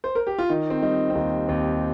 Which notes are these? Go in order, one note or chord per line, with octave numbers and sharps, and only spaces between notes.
C5
A#4
G4
F4
D#3 D#4
C4
G3 D#4
C4
D#2 D#4
D#2 C4